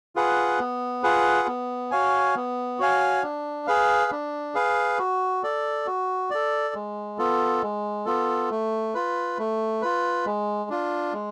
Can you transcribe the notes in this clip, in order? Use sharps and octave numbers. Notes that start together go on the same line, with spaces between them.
F4 G#4 B4 F#5
B3
F4 G#4 B4 F#5
B3
F#4 C#5 F5 G#5
B3
F#4 C#5 F5 G#5
D4
G#4 B4 F5
D4
G#4 B4 F5
F#4
A4 D5
F#4
A4 D5
G#3
B3 F4 A4
G#3
B3 F4 A4
A3
F4 B4
A3
F4 B4
G#3
D4 F4
G#3